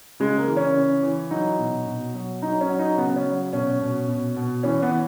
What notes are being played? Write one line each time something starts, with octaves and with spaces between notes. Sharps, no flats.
C#3 G#3
A#3
E3
C#4
C#3
E3
F#3 D#4
B2
B2
F#3
F#3 D#4
C#4
F#3
D#4
C#3 B3
B3
C#4
F#3
B2 C#4
B2
B2
B2
E3 C#4
B3
E3